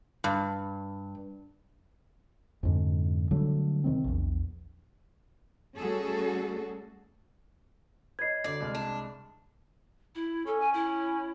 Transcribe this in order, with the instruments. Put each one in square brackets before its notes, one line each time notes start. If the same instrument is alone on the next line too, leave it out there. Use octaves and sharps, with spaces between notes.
[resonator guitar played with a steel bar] G2
[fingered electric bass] F2 G#2 D3
D3 F#3 G3 A3
C3 D#3 G3 C4
A#1 E2
[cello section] G3 A3 C#4 F#4 G#4 A4
[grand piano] B4 C#5 D#5 [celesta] G#6 C7
[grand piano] D2 [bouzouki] D5
[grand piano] C2 G#3 F6
[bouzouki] D4
[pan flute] E4
[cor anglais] C#4 [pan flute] A4
[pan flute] G#5
E4